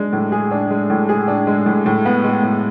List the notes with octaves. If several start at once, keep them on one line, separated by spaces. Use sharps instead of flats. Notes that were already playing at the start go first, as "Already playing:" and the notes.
Already playing: G#3 D4
A2
G#4
D4
G#3
A2
G#4
D4
G#3
A2
A2
B3
G#3
A2